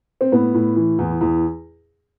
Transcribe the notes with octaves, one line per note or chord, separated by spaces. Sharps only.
C4
A2 B3
A2
E3
E2
E2